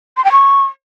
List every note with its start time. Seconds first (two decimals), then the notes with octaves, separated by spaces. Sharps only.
0.17 C6
0.25 G5
0.32 C#6